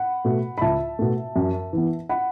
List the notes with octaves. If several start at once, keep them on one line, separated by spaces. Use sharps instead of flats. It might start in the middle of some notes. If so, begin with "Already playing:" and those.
Already playing: F#5 B5
B2 A3
B5
C#2 E5 A5
B2 A3
F#2
E3 B3
F#5 B5